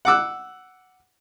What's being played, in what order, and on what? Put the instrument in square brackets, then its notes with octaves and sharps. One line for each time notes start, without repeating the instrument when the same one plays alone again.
[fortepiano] F#5 D6 E6 F#6